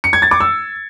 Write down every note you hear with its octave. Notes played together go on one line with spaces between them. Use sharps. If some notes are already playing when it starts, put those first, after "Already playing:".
C#7
G#6
A6
D6
E6